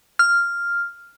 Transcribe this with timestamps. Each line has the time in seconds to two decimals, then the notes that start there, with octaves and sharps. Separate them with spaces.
0.19 F6